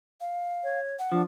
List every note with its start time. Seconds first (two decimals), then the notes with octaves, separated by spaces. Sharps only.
0.21 F5
0.64 C#5
0.99 F#5
1.12 F3 D4